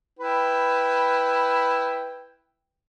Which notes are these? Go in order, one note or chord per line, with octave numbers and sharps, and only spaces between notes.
E4 B4 G5